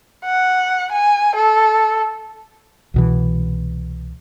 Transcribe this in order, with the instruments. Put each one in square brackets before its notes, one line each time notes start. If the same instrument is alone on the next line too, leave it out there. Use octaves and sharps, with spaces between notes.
[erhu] F#5
G#5
A4
[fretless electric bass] C2 B2 E3